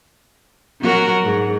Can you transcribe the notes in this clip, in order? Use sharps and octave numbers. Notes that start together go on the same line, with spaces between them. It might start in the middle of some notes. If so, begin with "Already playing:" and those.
F#3 F#4 A#4
G#2